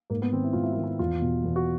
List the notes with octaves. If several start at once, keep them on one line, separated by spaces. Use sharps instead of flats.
G#2 A#3
B3
D#3 C4
E4
G#2 F4
E4
D#3 F4
E4
E2 F4
B2
E2
F#4